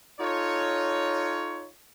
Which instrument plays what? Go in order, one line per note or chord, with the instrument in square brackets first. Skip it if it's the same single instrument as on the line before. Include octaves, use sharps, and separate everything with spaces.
[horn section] D#4 F4 A4 C#5